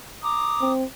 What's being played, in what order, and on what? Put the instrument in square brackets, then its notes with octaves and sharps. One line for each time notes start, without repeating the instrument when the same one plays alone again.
[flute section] A#5 D6 D#6
[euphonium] C4